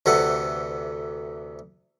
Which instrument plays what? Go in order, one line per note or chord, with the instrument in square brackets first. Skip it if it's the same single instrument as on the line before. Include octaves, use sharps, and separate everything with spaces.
[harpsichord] D2 C3 E3 A4 F#5